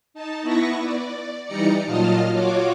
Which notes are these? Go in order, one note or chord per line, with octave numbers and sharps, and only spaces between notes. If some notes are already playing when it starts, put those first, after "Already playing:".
D#4 A5
B3 E4 B4 C#6 A#6
D5
E3 G3 D#4 D5 A#5 C#7
A#2 F#3 F4 D#5 A5 F6
F4 F#4 C#5 D6